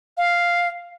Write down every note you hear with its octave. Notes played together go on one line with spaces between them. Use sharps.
F5